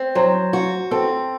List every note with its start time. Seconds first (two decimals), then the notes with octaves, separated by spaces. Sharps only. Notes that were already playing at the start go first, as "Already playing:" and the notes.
Already playing: C4
0.15 F#3 C5
0.53 F#4
0.91 C4 A4